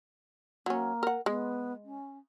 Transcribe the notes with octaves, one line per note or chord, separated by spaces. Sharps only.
F#3 A#3 C#4
A#4 F#5
G#3 B3
C#4